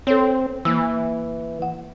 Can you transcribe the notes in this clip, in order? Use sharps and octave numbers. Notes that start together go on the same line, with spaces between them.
C4 A4 C#5
E3 A#3 E6
F#5